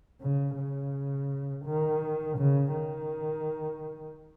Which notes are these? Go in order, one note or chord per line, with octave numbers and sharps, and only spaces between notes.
C#3
C#3
D#3
C#3
D#3